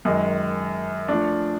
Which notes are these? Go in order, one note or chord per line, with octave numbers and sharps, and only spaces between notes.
F#2 D#3 G#3
F3 A3 D4